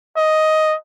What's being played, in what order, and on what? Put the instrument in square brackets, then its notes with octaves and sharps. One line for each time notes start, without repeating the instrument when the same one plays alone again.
[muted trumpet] D#5